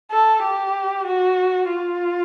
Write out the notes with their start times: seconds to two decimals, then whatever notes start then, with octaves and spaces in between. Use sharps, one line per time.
0.12 A4
0.44 G4
1.07 F#4
1.70 F4